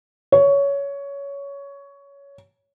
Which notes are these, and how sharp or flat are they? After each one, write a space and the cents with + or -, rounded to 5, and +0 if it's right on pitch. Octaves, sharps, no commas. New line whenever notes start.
C#5 +15